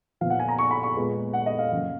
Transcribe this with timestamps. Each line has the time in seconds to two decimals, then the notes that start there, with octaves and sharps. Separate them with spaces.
0.21 A#2 F3 B3 F5
0.30 F#5
0.40 G#5
0.48 A#5
0.59 C#6
0.71 B5
0.83 C#6
0.96 A#2 G#3 B3
1.33 F#5
1.46 D#5
1.59 F5
1.71 F#2 C#3 F3 A#3